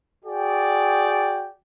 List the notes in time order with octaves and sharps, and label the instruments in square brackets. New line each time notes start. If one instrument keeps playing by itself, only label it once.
[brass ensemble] F#4 G#4 D5 G5